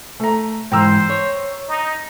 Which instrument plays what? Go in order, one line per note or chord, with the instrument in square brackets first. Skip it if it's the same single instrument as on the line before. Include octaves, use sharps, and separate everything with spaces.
[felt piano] A3 A#5
[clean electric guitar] G#2 E3 [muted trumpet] C5 [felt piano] G5 A#5 E6
[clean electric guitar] C#5
[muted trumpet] D#4